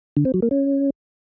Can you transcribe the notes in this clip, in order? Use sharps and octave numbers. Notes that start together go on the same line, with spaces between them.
D3
C4
F#3
A#3
C#4